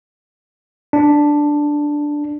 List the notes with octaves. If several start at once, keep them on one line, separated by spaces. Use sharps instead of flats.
D4